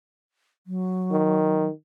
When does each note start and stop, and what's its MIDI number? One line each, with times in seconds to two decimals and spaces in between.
0.67 1.67 54
1.11 1.70 51